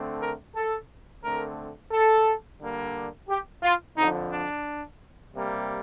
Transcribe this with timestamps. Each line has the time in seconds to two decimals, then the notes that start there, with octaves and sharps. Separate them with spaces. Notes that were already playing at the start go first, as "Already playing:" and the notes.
Already playing: D3 A3 C4
0.21 A#4
0.55 A4
1.23 D3 A3 C4 A#4
1.91 A4
2.60 D3 G3 A#3
3.28 G4
3.63 F4
3.96 F2 D3 F3 D#4
4.30 D4
5.33 C3 G3 A#3